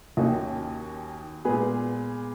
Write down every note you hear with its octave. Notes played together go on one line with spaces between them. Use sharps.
D#2 D#3 A#3 C#4 D#4 F#4
A#2 G#3 B3 G#4 B4